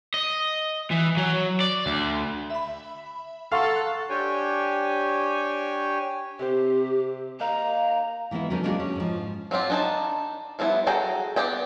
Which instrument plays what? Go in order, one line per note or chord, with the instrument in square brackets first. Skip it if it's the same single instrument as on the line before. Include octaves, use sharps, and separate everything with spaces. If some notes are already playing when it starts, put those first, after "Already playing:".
[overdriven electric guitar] D#5
E3
F#3
D5
D2
[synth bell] E5 B5
[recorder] A4 [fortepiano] F5 [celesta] F#5 C6 C#6 [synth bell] A#5 E6 F6
[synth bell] F#6
[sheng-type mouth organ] D4 G4 C#5 G5 G#5
[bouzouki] C3 C4 C5 [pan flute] G4
[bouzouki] A#3 D#4 F5 [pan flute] A#5
[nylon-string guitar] E3 G#3 A#3 B3 E4
D3 F#3 B3 C#4 D#4 A#4
G#3 A#3 B3 D4 F#4 G#4
C#4
G#2 F3
[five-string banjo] F#3 C4 F4 G4
D4 D#4 A5
F3 G3 B3 D#4 E4
F#4 G#4 A4 G5 A#5
B3 G4 D5 D#5 G5